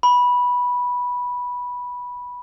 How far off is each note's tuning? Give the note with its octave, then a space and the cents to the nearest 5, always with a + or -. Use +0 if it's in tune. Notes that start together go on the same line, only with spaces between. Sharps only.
B5 -10